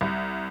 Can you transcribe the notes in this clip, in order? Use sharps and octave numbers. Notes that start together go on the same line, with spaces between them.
C2